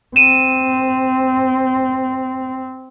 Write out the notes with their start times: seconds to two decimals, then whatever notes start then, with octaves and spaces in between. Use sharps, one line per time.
0.16 C4 D#7 E7